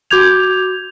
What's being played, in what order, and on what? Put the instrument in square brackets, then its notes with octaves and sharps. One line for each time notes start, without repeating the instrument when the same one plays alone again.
[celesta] F#4 D6 G6 G#6 F7